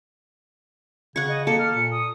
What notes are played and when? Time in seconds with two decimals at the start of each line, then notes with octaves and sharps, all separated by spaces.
1.16 C#3 F#5 C#6 G#6
1.29 D#5
1.47 A#3 A4 C#7
1.59 F6
1.73 A#2 C#7
1.91 D#6